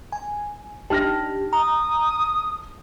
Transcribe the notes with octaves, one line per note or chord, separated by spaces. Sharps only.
G#5
D4 D#4 G4 A5 F6 A#6
A#5 D#6